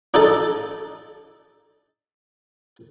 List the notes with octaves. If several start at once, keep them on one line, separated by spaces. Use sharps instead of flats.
D4 D#4 A4